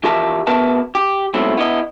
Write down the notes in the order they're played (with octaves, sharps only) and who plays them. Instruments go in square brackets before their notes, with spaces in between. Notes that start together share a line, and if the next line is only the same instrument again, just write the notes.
[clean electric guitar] E3 F3 G4 A#4 E5 A5
B2 B3 A#4 B4 E5 A5
G4
G#2 B2 F#3 A3 C4 E4
B3 E4 B4 D#5